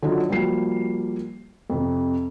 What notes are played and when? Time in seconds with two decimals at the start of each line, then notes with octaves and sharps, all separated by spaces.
0.03 D3 F#3 D#4 F4
0.29 F3 G3 A#3 F#4 C7
1.70 F2 C3